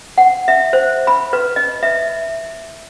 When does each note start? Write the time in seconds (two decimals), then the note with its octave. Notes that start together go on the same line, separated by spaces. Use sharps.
0.18 F#5
0.48 E5
0.73 C5
1.07 B5
1.33 B4
1.56 D#5
1.83 E5